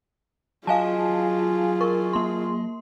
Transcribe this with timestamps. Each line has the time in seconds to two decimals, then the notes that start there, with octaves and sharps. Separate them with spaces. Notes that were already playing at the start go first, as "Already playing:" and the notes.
0.67 F#3 F4 G#4 D#5 F5 G#5 A5
1.81 A#4 C#6
2.13 A#3 C6